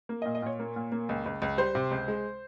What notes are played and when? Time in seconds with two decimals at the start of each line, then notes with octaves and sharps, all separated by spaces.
0.09 A#3
0.22 A#2 D#5
0.35 D#5
0.42 A#2 C#5
0.59 A#3
0.76 A#2
0.92 A#3
1.09 C#2
1.26 C#2
1.42 C#2
1.58 G3 C5
1.75 C3
1.91 C#2
2.08 G#3